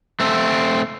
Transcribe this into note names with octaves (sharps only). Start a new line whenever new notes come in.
A3 C4